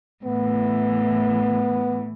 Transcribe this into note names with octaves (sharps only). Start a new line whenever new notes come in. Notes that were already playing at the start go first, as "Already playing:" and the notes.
A2 E3 B3